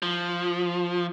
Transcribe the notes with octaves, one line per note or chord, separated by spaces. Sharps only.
F3